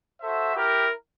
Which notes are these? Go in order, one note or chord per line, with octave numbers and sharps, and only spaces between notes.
F#4 A4 C5 E5
E4 G4 A#4